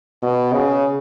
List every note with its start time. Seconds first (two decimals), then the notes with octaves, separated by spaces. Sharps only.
0.23 B2
0.53 C#3